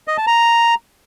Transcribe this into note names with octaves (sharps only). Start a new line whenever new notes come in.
D#5
A5
A#5